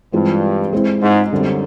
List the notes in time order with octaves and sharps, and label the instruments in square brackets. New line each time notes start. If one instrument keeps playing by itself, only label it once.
[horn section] G2 [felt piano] E3 G#3 C4 F4
[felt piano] G#3 C4 E4
[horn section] G#2
[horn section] F#2 [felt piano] D3 G3 C4